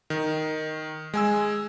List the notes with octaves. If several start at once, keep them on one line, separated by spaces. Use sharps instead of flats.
D#3
G#3 G#5 E6